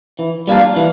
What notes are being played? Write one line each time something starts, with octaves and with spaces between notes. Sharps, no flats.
E3
G3 A#3 D4 F4
E3